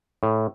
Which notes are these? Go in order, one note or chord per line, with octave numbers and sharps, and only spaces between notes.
A2